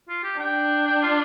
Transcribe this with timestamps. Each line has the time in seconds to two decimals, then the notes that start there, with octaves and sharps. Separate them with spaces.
0.09 F4
0.24 G4
0.40 D4 G5
0.87 G5
1.03 F4